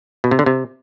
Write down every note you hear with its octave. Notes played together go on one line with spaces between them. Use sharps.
B2
C3
D3
C3